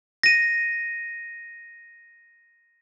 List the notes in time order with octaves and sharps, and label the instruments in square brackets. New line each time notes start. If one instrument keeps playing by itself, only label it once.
[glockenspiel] A#6 D#7